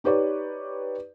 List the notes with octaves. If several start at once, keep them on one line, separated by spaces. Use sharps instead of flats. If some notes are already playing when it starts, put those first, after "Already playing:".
D#4 G4 B4 C#5 D5